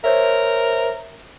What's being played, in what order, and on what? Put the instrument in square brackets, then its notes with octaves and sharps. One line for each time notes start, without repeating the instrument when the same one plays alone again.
[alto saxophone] A#4 [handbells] C5 C#5 E5